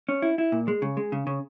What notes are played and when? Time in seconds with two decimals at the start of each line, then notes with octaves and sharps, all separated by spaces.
0.09 C#4
0.22 E4
0.38 E4
0.52 A#2
0.68 G#3
0.82 C#3
0.97 G#3
1.12 C#3
1.27 C#3